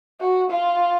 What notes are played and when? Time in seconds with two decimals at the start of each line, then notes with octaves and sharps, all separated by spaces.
0.21 F#4
0.51 F4